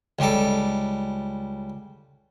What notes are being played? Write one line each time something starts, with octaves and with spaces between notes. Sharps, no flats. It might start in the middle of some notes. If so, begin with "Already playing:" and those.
C#2 G3 A4